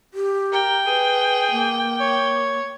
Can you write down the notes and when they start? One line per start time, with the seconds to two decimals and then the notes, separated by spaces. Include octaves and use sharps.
0.14 G4
0.52 A#4 G5
0.86 G#4 B4
1.52 A#3
2.00 C#5